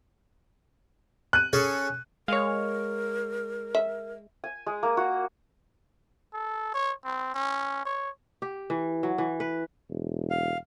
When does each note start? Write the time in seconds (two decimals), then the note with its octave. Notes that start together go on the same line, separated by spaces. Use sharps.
1.33 F#6 D#7
1.53 C#4 G#4 A4
2.28 G#3 A#4 C#5 F5
3.75 E5
4.44 G#5
4.66 G#3
4.83 A#3
4.97 F#4
6.33 A4
6.74 C#5
7.04 C4
7.34 C#4
7.85 C#5
8.42 G4
8.70 E3
9.03 F#3
9.18 E3
9.40 B4
9.90 E1
10.30 F5